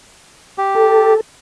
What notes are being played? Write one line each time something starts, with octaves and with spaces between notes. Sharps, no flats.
G4
A4